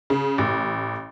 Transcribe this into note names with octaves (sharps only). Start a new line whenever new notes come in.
C#3
A1